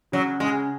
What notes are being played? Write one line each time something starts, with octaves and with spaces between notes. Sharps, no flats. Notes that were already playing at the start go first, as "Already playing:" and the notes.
C#3 F#3
C#3 G#3